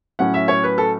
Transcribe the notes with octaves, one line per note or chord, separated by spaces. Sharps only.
A2 F#3 C#4 F#5
E5
C#5
B4
A4